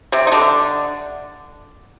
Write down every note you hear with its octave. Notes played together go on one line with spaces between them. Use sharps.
C3 C4
D#4
D3 D4